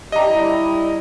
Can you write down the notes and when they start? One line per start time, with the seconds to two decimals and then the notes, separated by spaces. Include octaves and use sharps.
0.12 D4 G4 D#5 E5 A#5
0.27 G3 E4